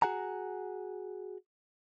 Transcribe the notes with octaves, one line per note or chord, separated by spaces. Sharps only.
F#4 G#4 F#5 G#5 A#5